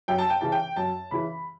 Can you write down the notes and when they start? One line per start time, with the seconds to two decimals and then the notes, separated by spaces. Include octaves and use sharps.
0.08 F#2 G5
0.18 A5
0.30 G5
0.41 C#3 E3 A5
0.52 G5
0.76 F#2 A5
1.11 C#3 E3 B5